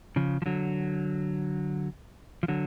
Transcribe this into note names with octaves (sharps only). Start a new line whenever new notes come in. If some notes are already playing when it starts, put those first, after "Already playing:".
C#3 F3
F3
D3 F#3
F3
D3 F#3